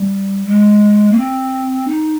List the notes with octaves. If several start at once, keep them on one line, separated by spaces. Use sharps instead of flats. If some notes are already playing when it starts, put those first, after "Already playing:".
Already playing: G3
G#3
A#3
C4
D#4